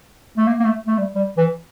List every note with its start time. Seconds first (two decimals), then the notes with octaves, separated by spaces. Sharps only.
0.38 A3
0.47 A#3
0.60 A#3
0.65 A3
0.87 A3
0.98 G3
1.15 G3
1.37 E3